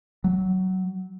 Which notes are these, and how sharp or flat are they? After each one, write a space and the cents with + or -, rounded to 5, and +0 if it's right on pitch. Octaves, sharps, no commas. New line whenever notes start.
F#3 +15